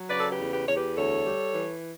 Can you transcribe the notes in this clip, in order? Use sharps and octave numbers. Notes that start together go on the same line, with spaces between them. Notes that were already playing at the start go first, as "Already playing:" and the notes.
Already playing: F#3
C#3 B4 D5
A4
G4 B4
E2
G4 B4
E2 C#5
G4 B4
D2 A4 C#5
G3
E3